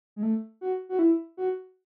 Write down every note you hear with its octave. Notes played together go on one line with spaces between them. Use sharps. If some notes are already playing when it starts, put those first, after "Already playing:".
G#3
A3
F#4
F#4
E4
F#4